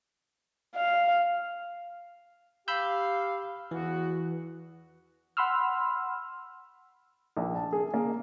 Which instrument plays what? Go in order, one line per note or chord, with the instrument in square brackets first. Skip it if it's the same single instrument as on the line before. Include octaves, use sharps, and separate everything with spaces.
[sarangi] F5
[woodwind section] G4 F5 [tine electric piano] B5 E6 G6
[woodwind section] E2 B3 F#4 [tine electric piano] E3
[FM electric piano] F#5 B5 C6 E6 F6
[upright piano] A#1
A5
G#4
A#3